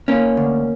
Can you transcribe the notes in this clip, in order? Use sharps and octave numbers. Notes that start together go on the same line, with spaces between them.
A#3 C#4
D2